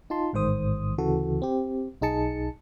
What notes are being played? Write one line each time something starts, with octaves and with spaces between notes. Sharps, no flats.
D#4 F4 A5 C6
A1 G#2 D#3 C5 D#6
D2 C#3 E3 F#4 A4
C4 G4
B1 D#4 G#4 A5 C#7